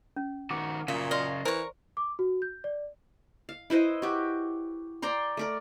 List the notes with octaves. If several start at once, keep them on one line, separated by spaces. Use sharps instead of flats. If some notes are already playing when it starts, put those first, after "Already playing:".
C#4
D#3 F#4 D6
A#2 C#3 F#3 E5 F5
D5 D#5 F5 C6
E3 A#4 C5 C#6
D6
F#4
G6
D5
F5
E4 B4 C5 D#5
F#4 G4
D5 G5 A#5 C6
A3 A#4 D5